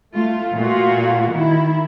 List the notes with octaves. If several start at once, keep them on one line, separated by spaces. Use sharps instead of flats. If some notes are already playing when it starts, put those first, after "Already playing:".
A3 F4
A#2 A3 F4 F#4
D#3 E4